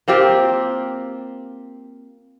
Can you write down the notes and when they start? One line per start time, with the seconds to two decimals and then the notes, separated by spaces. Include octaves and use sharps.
0.08 A#3 C4 F4 G4